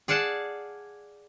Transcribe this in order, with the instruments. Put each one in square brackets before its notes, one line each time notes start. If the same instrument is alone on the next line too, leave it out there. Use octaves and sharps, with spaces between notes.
[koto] G#4 D5 F5 F#5 A5